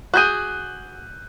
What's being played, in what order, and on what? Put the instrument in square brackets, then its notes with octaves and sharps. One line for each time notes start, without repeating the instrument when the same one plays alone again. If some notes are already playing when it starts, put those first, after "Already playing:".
[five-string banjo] F#4 G#4 [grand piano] F#6 G6 D#7